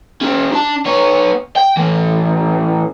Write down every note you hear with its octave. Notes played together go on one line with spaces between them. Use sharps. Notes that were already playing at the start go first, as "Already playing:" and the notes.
C#4 G4
D4 A5
B3 C#5
G5
A2 E3